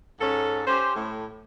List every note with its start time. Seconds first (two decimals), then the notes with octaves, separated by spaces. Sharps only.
0.20 G#2 C#4 A4
0.67 C#4 G4 C5
0.96 A2